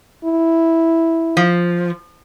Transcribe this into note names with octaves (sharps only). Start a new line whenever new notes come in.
E4
F3